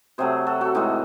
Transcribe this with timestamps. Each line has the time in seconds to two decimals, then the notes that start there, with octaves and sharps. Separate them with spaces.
0.18 C3 F#3 A3 G#4 C5
0.47 F#4 A4
0.61 F#4 A4
0.75 A2 E3 G#3 D#4 F#4